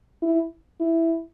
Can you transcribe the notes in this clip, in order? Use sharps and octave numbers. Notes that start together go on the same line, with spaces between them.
E4
E4